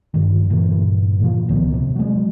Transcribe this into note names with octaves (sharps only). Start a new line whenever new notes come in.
G2 D#3
G2 A#2 D3 E3
A#2 F3
E1 C#2 D#3 B3
C3
F#3 G#3